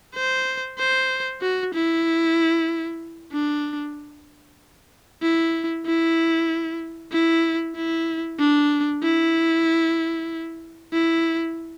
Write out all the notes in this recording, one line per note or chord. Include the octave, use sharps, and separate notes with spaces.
C5
C5
F#4
E4
D4
E4
E4
E4
E4
D4
E4
E4